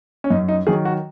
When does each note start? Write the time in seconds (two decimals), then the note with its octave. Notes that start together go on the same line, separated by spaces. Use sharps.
0.24 C#4
0.30 F#2 D#4
0.48 D#4
0.67 D#3 F#3 G#4
0.85 F#4